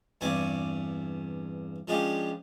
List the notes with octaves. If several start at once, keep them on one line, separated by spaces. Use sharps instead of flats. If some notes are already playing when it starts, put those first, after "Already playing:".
E2 G2 C4 D5 G#5 C#6
F3 G#3 C#4 D4 G4